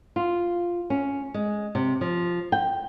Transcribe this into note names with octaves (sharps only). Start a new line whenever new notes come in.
F4
C#4
G#3
C3
F3
G5